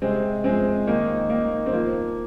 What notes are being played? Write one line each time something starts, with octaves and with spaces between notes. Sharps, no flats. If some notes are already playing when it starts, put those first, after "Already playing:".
C3 G#3 C4
F2 G#3 C4
D#3 A#3 D#4
D#3 A#3 D#4
C4
F3 A#3